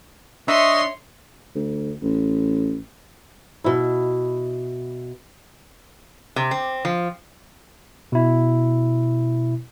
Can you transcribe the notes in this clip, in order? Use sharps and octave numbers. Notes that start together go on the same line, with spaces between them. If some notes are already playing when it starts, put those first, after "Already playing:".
D4 C#5 D#5 E5 C6 C#6 D#6
D2
A1
B2 E4
C3
C4
F3
B2 E4